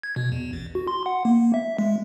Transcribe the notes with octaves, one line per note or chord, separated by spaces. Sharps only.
G#6
B2
E2
A1
F#4
C6
F#5
A#3
E5
G#3